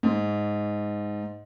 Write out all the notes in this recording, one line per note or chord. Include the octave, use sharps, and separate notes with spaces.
G#2